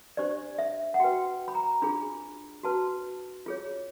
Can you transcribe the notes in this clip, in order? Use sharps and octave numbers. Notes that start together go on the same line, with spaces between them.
D4 G4 C5 D5
E5
F#5
F#4 B4 G5
B5
A#5
D4 F4 G#4 B5
F#4 B4 A5
F4 G#4 C#5